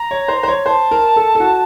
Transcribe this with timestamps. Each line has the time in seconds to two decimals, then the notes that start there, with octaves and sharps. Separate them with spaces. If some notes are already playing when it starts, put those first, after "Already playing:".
Already playing: A#5
0.11 C#5
0.28 C5
0.43 C5
0.48 C#5
0.66 C5 A5
0.91 A#4
1.16 A4
1.35 A4
1.40 F#4